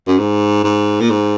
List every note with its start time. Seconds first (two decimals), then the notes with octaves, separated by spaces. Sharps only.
0.07 F#2
0.18 G#2
0.64 G#2
1.00 A#2
1.10 G#2